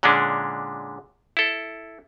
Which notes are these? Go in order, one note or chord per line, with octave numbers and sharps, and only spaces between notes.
A#2 D3 G#3 C#4 D4
E4 A4